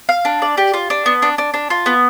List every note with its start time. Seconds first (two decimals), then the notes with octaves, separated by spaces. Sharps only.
0.09 F5
0.25 D4
0.42 D5
0.57 G4
0.74 F4
0.90 D4
1.06 B3
1.22 D4
1.38 D4
1.54 D4
1.70 F4
1.86 B3